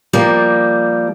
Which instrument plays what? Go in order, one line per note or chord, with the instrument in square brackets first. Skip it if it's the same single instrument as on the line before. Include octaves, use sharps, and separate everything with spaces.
[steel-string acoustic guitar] F3 G3 A#3